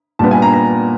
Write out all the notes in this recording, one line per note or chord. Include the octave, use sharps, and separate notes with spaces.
A#2 G3 B3 A5
G#5
A#5
A#5